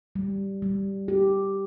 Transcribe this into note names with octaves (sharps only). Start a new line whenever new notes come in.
G3
G3
G4